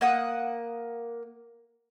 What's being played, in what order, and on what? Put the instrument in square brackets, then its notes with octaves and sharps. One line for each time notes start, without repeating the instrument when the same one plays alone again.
[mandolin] A#3 F#5 D#6